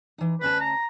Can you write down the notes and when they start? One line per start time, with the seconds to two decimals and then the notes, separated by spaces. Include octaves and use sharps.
0.18 E3 D#4
0.41 D2 C#4 B4 A5
0.60 A#5